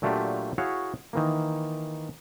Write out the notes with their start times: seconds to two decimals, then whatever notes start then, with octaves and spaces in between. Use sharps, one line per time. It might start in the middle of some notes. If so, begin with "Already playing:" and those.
0.02 A#2 F#3 A3 D4 F4 G4
0.58 E4 F#4 G#4 C#5 E5 F5
1.13 D#3 E3 A#3